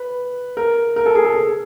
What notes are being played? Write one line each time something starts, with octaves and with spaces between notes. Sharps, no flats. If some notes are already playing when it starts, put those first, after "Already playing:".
Already playing: B4
A#4
A#4
A4
G#4
A4